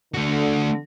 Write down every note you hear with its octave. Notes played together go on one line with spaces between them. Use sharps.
D3 A3 F#4